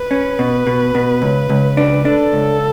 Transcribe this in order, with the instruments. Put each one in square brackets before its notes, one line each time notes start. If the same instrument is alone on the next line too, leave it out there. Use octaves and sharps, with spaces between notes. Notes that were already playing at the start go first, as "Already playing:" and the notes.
Already playing: [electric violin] B4
[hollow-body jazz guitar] C#4
B2
B2
B2
C#2
C#2
D4
[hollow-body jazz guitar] D4 [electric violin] A4
[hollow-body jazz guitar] C#2